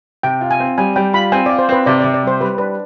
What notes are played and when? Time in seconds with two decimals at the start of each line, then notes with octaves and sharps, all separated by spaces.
0.23 C3 G5
0.41 F4
0.51 G#5
0.60 C4
0.78 G3 G#5
0.96 G3 G5
1.13 F4 B5
1.32 C4 G#5
1.46 F4 D5
1.59 C5
1.69 C4 B4
1.86 C3 D5
2.00 C3 D5
2.14 D5
2.23 G3 C5
2.40 G3 B4
2.58 D4 B4